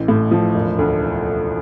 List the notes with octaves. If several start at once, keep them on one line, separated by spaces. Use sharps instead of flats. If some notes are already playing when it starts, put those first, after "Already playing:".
Already playing: A1
A2
F3
E1
D2